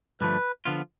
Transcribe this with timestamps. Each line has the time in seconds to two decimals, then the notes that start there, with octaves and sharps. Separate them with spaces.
0.21 G2 D3 F3 A3 B4
0.65 D3 F3 B3 F4